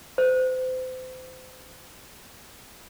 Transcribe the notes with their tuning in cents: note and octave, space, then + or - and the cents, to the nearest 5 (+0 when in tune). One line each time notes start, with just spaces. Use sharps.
C5 -35